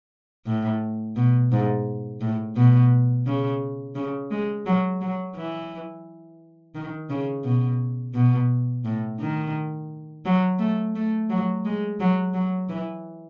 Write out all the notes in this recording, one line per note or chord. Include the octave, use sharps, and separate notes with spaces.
A2
B2
G#2
A2
B2
C#3
C#3
G#3
F#3
F#3
E3
D#3
C#3
B2
B2
A2
D#3
F#3
A3
A3
F#3
G#3
F#3
F#3
E3